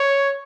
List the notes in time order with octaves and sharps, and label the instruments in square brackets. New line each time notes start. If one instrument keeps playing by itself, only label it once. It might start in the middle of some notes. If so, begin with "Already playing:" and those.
Already playing: [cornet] C#5